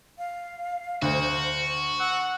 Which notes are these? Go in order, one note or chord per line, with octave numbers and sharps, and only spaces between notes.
F5
D2 F#4 C5
F#5 E6